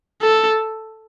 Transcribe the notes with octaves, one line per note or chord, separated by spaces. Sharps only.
A4